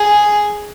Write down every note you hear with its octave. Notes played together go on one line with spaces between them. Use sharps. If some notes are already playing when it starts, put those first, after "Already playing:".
Already playing: G#4